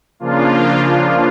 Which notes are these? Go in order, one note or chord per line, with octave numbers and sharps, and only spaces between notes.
C#3 F3 A#3 D4 F4